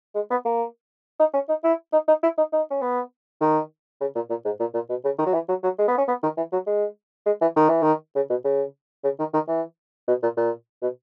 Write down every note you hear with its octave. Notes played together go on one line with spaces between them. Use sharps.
G#3
B3
A#3
D#4
C#4
D#4
E4
D#4
D#4
E4
D#4
D#4
C#4
B3
D#3
C#3
A#2
A#2
G#2
A#2
A#2
B2
C#3
D#3
F#3
E3
F#3
F#3
G#3
B3
C#4
B3
D#3
E3
F#3
G#3
G#3
E3
D#3
E3
D#3
C#3
B2
C#3
C#3
D#3
D#3
E3
B2
A#2
A#2
B2